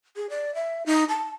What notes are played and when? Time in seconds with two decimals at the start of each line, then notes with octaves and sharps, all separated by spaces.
0.16 G#4
0.30 D5
0.55 E5
0.86 D#4
1.09 A5